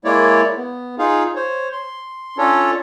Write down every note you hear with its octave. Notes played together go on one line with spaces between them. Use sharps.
G#3 A#3 E4 C#5 D5
B3
D#4 F4 G#4 F5
C5 C#5
C6
C#4 D4 F4 A4 C#5